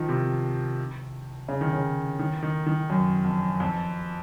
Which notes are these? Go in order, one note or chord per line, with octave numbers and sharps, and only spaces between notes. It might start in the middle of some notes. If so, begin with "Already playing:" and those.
Already playing: D#3 F3
C3
C#3
D#3
C#3
D#3
D#3
D#3
F#2
F2
F2